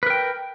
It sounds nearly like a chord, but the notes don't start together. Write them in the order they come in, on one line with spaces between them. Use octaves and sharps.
B4 A#4 G5